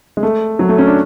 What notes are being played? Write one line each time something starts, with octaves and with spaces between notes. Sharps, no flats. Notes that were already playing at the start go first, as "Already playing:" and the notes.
G#3
A3
F#3
A3
C#4
D4